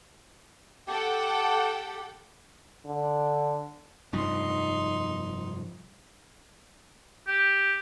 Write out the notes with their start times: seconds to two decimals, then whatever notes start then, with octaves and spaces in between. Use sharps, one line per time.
0.87 G4 A4 F#5 G5
2.86 D3
4.13 F1 G2 F3 D#4 C6
7.27 G4